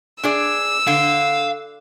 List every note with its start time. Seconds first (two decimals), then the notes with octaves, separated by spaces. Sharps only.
0.23 D4 G#4 D5 E6
0.87 D3 F5